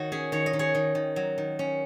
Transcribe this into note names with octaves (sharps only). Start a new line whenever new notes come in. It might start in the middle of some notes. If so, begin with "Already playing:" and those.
Already playing: D#3 F#4 C#5
C#4 G#4
D#3 C#5
D#5
D#3
G#4 C#5
D#3
D#3
F#3
D#3
C#4